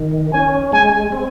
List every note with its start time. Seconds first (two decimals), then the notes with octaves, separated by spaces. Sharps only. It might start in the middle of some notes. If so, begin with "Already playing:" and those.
Already playing: D#3
0.33 C#4 G#5
0.73 G#3 G#5
1.12 C4